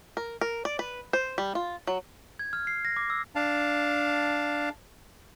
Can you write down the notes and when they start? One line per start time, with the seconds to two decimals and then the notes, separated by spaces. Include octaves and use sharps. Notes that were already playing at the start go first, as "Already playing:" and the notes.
0.17 A#4
0.41 A#4
0.65 D5
0.79 B4
1.13 C5
1.38 G3
1.55 F4
1.87 F#3
2.39 G#6
2.53 F6
2.67 C7
2.85 A#6
2.97 D6
3.10 E6
3.35 D4 F5 A5